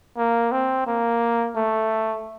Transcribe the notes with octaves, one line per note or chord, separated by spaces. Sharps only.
A#3
C4
A#3
A3